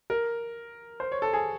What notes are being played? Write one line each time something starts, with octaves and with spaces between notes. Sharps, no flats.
A#4
C5
C#5
A4
G#4